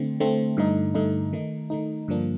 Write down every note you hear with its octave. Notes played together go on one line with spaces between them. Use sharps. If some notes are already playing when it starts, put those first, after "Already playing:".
Already playing: D3 A3 C4
D3 A3 C4
G2 D3 A3 D#4
G2 D3 A3 D#4
D#3 A3 D#4
D#3 A3 D#4
G2 D3 F3 A#3 D4